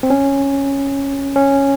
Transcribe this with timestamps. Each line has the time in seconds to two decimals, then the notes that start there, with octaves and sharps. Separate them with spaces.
0.03 C4
0.10 C#4
1.36 C#4